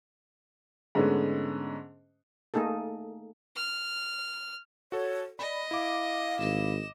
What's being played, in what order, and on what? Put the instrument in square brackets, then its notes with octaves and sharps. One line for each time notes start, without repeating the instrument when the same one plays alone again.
[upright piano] G#2 D3 G#3 A3 B3 C#4
[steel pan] A3 A#3 D#4 G#4 A4
[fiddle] F6
[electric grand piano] F#4 A4 [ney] C#5
[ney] D5 [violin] D#5 [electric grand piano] B5
[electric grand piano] E4 D6 [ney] F5
[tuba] G#1 [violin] D#5 E7